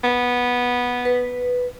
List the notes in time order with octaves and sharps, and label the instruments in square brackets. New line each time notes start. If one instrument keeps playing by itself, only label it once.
[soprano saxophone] B3
[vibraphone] B4